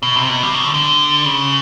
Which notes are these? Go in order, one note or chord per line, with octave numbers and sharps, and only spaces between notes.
B2
C3
B2
C3
C#3
D3
D3
C#3